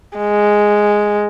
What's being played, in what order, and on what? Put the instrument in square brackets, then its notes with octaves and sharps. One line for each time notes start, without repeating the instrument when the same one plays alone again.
[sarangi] G#3